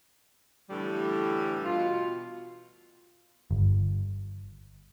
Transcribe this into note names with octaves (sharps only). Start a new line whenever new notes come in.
A2 D3 E3 G3
B2 F4
G1